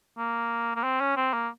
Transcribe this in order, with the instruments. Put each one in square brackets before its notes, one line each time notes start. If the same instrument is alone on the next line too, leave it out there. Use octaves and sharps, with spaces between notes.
[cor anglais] A#3
A#3
C4
C#4
C4
A#3